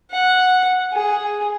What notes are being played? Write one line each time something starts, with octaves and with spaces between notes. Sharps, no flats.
F#5
G#4